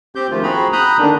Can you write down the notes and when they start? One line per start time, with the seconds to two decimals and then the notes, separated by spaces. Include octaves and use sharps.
0.15 C4 G4 G6
0.30 D#3 F3 G#3 A3 F4
0.43 C4 F#4 G#4 A#5 B5
0.73 A#5 B5 D#6 F#6 G6
0.98 D3 D#3 D4